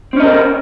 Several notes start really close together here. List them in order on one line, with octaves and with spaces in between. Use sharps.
C4 C#4 D#5 A#4